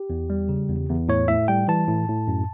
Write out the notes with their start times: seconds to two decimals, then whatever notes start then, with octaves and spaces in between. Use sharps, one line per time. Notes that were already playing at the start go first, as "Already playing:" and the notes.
Already playing: G4
0.10 E2
0.30 G3
0.49 C#3
0.69 E2
0.89 E2
1.08 A2 C#5
1.28 A2 E5
1.48 G3 G5
1.68 E3 A5
1.87 A2
2.08 A2
2.28 F#2